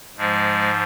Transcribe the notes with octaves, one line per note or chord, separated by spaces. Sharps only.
G#2 F3 G#3